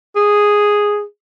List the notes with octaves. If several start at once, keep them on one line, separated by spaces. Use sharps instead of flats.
G#4